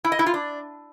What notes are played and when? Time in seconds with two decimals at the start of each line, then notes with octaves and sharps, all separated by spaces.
0.04 E4
0.12 D#5
0.19 E4
0.26 F4
0.34 D4